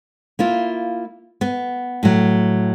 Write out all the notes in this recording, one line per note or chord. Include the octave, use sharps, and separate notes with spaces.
A#3 E4 F4
B3
A2 F#3